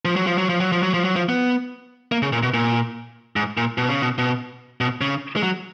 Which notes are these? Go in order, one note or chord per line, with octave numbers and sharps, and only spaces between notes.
F3
F#3
F3
F#3
F3
F#3
F3
F#3
F3
F#3
F3
B3
A#3
C#3
A#2
B2
A#2
G#2
A#2
B2
C#3
B2
B2
B2
C#3
G#3
F#3